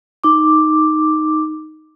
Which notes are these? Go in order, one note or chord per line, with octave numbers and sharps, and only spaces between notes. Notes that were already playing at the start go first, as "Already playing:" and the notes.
D#4 D6